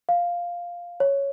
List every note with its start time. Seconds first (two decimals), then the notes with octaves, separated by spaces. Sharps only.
0.09 F5
1.00 C#5